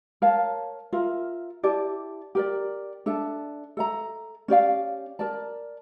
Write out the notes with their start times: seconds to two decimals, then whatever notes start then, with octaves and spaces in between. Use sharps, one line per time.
0.22 A#4 C#5 F5 A5
0.93 F4 A#4 E5
1.63 E4 G4 D5 A5
2.35 G4 A#4 D5
3.06 D4 A4 E5 A5
3.77 A4 E5 A#5
4.48 C#4 G4 D5 F5
5.19 A#4 D5 A5